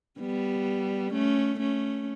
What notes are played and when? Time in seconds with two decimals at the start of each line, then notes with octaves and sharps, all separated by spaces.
0.20 G3 B3
1.13 A3 C#4
1.59 A3 C#4